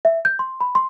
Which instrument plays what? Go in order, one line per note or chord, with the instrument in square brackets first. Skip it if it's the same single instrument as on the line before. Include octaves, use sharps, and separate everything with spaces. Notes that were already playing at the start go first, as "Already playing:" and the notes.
[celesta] E5
G6
C6
B5
C6